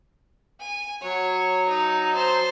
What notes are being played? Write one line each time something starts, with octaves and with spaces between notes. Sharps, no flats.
G#5
F#3 C#5
D#4
C5 A5